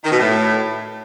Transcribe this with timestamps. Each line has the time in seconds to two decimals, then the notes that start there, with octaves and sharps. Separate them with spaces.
0.03 D#3
0.11 B2
0.19 A2